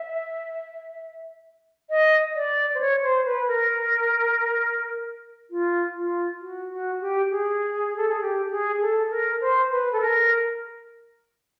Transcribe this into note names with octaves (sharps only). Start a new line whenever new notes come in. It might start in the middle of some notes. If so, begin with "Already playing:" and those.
Already playing: E5
D#5
D5
C5
C#5
C5
B4
A#4
F4
F4
F#4
F#4
G4
G#4
A4
G#4
G4
G#4
A4
A#4
C5
B4
A4
A#4